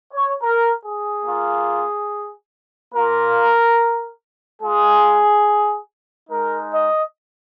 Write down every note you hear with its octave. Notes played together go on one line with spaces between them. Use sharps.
C#5
A#4
G#4
A#3 F4
A#3 F4 A#4
G#3 F4 G#4
G#3 D#4 A#4
D#5